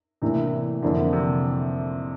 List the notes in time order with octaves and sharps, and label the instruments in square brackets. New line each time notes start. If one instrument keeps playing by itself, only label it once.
[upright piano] A2 E3 A#3 D4 [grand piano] C3
[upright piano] F2 E3 A#3 D4 [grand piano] D3
[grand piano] C3